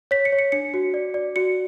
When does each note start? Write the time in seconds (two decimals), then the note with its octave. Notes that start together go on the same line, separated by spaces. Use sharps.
0.11 C#5 B6
0.25 C#7
0.32 C#5
0.39 C#7
0.52 D4 C#7
0.74 F#4
0.94 D5
1.14 D5
1.36 F#4 C#7